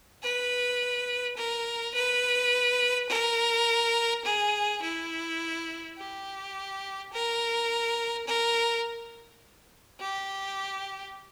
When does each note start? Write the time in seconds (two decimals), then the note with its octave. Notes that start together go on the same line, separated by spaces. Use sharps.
0.23 B4
1.37 A#4
1.94 B4
3.10 A#4
4.25 G#4
4.82 E4
5.98 G4
7.13 A#4
8.27 A#4
10.00 G4